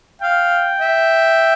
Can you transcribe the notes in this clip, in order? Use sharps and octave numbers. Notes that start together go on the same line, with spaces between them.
F5 G5
E5